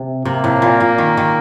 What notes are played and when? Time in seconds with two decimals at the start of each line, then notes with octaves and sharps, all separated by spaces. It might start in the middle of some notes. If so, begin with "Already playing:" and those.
Already playing: C3
0.25 C3 A#3
0.44 A2
0.62 A#2
0.80 A#2
0.98 D#3
1.17 D#3